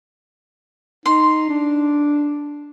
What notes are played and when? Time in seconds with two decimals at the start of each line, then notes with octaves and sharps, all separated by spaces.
1.06 D#4 C6
1.49 D4